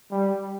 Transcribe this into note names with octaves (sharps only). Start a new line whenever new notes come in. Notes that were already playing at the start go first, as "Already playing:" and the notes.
G3